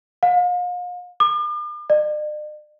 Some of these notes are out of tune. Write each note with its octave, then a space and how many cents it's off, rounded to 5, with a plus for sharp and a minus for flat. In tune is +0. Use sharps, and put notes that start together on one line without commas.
F5 +40
D6 +45
D5 +45